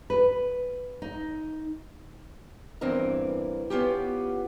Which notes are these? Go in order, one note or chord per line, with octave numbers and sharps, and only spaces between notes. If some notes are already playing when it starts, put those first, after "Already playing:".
B4
D#4
E2 G2 E3 C4 A#4
B3 C#4 F4 G4